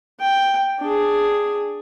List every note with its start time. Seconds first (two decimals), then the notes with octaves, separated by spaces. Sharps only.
0.20 G5
0.80 D4 G#4